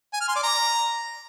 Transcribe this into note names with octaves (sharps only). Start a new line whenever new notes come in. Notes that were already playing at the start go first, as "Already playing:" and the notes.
G#5
F6
C6
D5
A#5